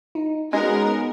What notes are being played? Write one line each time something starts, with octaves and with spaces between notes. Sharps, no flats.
D#4
G#3 B3 C#4 D#4 F#4 A#4